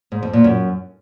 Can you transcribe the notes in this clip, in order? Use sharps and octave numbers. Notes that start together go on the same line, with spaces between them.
G#2
F2
A#2
F#2